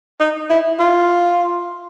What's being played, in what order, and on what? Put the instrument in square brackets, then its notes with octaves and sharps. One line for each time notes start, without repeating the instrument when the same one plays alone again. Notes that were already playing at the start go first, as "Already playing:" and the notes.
[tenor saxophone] D#4
E4
F4